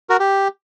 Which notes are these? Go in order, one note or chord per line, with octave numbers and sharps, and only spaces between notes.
F#4 A#4
G4